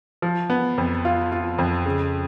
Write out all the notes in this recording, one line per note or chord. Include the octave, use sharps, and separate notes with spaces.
F3
B3
F2
F4
F4
F2
C#3